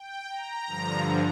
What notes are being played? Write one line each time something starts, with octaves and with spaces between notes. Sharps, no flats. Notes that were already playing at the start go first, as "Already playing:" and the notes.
Already playing: G5
A#5
G2 D3 F3